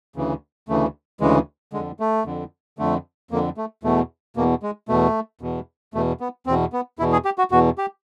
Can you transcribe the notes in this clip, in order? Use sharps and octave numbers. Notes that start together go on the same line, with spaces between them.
D2 C#3 E3
D2 C#3 E3 A3
D2 C#3 E3 G#3
F2 D3 G#3
A3
F2 D3
F2 D3 A3
F2 D3 A#3
A3
E2 B2 A3
E2 B2 A#3
G#3
E2 B2 A3
E2 B2
E2 B2 A3
B3
E2 B2 C4
B3
E2 B2 E4
G#4
G4
F#4
E2 B2 F#4
G4